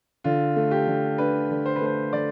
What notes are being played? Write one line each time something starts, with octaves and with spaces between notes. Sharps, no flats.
D3 F4
A3
G4
D3
D4 B4
D3
C5
B4
A3 C5
D3 D5